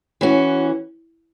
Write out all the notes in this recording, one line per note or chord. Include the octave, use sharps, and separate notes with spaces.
E3 C#4 F#4